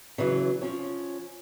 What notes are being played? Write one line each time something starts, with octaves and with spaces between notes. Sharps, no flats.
C#3 E3 F#3
F3 C#4 C#5